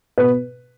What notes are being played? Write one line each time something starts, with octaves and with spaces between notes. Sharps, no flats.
B2 B4